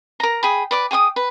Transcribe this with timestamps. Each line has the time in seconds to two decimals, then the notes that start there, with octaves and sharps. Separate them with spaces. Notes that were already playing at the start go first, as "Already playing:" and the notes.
0.20 A#4 A#5
0.43 G#4 G5 B5
0.71 B4 D5 D6
0.91 G#4 G5 C#6 D#6
1.16 B4